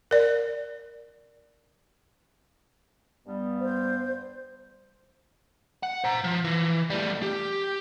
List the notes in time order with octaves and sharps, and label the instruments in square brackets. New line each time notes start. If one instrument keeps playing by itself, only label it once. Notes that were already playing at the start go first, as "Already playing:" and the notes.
[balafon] A#4 D5
[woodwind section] G2 G3 B3
[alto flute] C5
[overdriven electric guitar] F#5
C5 A#5
F3
E3
G3 A3
G4